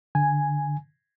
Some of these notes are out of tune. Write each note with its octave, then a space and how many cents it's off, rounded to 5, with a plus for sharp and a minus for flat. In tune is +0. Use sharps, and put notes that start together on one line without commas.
D3 +0 G#5 +0